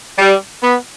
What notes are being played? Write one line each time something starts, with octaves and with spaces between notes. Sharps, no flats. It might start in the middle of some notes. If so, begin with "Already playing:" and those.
G3
B3